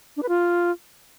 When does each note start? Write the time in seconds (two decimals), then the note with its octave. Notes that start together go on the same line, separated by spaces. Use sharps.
0.17 D4
0.23 B4
0.29 F4